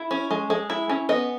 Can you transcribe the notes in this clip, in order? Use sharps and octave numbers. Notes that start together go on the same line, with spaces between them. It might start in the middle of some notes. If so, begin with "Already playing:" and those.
Already playing: E4
C#4
G#3
G#3
E4
C#4
B3 D#5